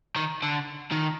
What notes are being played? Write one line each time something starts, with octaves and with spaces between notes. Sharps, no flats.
D#3
D3
D#3